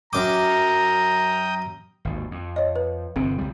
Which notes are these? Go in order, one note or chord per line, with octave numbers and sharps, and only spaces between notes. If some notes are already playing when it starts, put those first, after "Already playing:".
F#2 G5 A#5 D6 D#6
G#1 D#2
F2
C#5 D#5
B4
G1 C3 C4
C#2 G3